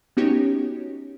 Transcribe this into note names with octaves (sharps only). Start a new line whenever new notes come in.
B3 C#4 D#4 F#4 G4 C#5